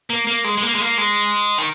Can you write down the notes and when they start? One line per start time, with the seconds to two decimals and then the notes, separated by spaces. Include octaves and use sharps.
0.10 A#3
0.27 A#3
0.44 G#3
0.57 G#3
0.63 A#3
0.75 G#3
0.81 A#3
0.98 G#3
1.58 D#3